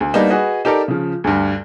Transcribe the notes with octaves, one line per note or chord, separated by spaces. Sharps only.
D2
G3 A#3 B3 D4 D#4
F#4 G#4 B4 D#5
D#4 G4 A4 A#4 D5
C#3 F3
D2 G2